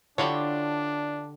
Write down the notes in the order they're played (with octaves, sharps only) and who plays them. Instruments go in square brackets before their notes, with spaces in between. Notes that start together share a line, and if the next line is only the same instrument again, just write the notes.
[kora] D3 G4 [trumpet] D4 [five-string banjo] E4 F4 C#5